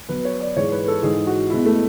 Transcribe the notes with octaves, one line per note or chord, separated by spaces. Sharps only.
B2 F#3 B4
C#5
D5
G#2 E3 G#3 C#5
B4
A4
G#2 E3 G#3 G#4
F#4
B2 G#3 E4
A3